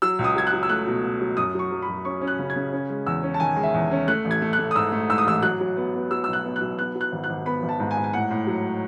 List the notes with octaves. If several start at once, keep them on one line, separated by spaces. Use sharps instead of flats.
F#3 E6
C#2
D#6
F#3 G#6
F#6
F#3
E6
A3 F#6
B2
B2
F#3
F#2 D#6
F#3 C#6
F#3
B5
F#2
C#4 C#6
C#4
F#6
C#3
G#6
C#3
C#4
G#3
E2 E6
C#4
A5
D#3 G#5
G#3
E5
E2
C#4
A3 F#6
A1
G#6
A3
F#6
A3
D#6
G#2 E6
A3
G#2 E6
D#6
A1 E6
F#3 F#6
F#3
B3
B3
F#3 E6
B1 E6
F#6
B3
F#6
B1
B3 F#6
F#3
F#6
G#1
F#6
G#1
B3 B5
G#1
A5
G#2
G#5
G#2
G#5
A2 F#5
A2
F#3